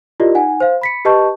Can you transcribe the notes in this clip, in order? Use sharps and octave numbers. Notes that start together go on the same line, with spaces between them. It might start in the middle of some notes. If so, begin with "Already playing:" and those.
E4 F4 G4 A#4 D5 D#5
D#4 F#5 G#5
C5 F5
B5 B6 C#7
G4 B4 D#5 A5 C#6 G6